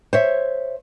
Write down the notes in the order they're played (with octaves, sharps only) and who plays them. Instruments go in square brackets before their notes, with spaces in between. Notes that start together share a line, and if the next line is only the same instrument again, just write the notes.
[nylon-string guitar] C5 C#5 E5